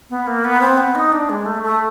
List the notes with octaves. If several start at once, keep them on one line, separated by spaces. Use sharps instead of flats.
B3
A#3
B3
C4
B3
D#4
D4
G#3
A3
A3